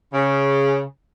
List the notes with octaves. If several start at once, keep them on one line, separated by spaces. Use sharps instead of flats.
C#3